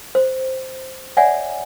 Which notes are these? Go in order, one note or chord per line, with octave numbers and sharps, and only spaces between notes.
C5
C#5 D5 E5 F#5 G#5